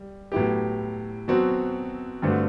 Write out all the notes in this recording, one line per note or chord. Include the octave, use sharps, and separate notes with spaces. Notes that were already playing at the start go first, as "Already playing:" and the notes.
Already playing: G3
A2 F#3 B3 E4 G4
B2 F#3 C4 F#4
G2 D3 A3 C4 F#4